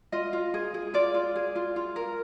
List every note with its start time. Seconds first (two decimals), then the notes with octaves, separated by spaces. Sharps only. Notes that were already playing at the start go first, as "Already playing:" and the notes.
0.12 F4 D#5
0.33 F4
0.54 G#4
0.74 G#4
0.94 F4 D5
1.14 F4
1.36 G#4
1.55 F4
1.76 F4
1.96 A#4